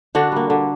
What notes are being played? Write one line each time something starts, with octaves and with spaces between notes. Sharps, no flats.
D3 D4 F#4
G3 A#3
D3